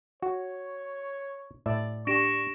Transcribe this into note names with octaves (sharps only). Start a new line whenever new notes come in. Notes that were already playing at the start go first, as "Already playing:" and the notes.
F#4 C#5
A2 D5 E5
D4 G4 C#6 A#6 D7 E7